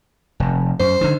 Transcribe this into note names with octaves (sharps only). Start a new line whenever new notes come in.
F1
F#2 C5
D3 D#3